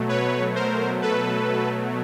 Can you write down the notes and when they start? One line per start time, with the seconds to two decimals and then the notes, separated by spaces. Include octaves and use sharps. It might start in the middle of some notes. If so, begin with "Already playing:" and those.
Already playing: B2 F#3 A3
0.09 B4 C#5
0.55 A#4 C5
1.02 A4 B4